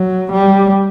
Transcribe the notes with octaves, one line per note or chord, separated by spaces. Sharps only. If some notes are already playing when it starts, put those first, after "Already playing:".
Already playing: F#3
G3